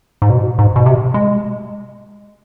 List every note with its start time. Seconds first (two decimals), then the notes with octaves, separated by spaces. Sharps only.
0.22 G#2
0.30 B2
0.59 G#2
0.76 B2
0.86 C3
1.14 G#3